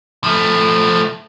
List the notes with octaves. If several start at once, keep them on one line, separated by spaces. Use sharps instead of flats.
F3 A3